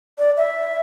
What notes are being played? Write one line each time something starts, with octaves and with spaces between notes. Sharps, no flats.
D5
E5